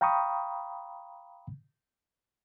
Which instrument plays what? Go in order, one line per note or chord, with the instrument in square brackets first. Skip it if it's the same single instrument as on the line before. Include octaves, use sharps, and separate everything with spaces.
[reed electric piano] F5 G5 A#5 B5 C#6 D#6